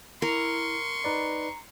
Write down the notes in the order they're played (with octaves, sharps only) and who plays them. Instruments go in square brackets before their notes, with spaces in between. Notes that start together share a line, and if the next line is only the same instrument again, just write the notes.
[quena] E4 [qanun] A#4 [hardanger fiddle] C6 C#6
[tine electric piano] D#4 B4 D5 [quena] A#5